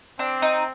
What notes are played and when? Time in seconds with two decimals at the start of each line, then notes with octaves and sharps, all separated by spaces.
0.19 C4 D4
0.42 D#4